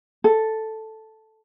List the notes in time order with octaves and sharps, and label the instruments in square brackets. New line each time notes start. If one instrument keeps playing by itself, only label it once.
[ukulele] A4